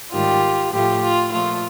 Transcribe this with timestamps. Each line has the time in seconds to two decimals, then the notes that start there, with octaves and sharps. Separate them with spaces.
0.12 G#2 D#3 G3 F4 G4
0.72 A2 F3 A3 F4 G4
1.02 F4
1.31 A#2 F3 A3 F4